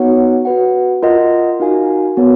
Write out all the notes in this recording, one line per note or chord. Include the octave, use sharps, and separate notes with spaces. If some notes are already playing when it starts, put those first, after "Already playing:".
Already playing: B3 D#4 F#4 C#5 F#5
F#4 B4 F#5
F4 A#4 D#5 F#5
D#4 F#4 A#4 F5 G#5
B3 F#4 A#4 C#5